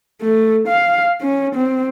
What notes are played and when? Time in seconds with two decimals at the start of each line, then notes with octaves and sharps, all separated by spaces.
0.22 A3
0.68 F5
1.21 C#4
1.55 C4